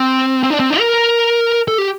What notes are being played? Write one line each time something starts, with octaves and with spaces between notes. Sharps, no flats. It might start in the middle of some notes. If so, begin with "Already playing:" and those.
Already playing: C4
C4
D4
C4
D4
A#4
A4
G4